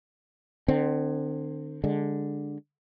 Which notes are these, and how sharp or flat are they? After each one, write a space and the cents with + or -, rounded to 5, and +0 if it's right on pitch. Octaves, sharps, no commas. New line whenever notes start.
D3 +40 C4 +0
D3 +0 G#3 -15